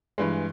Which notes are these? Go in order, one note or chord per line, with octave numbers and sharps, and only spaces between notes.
G2 E3 G#3